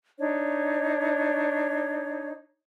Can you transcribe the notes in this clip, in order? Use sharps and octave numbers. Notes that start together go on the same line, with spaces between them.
D4 D#4 C#5